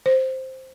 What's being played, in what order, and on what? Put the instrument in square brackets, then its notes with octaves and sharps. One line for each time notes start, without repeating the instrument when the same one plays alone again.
[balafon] C5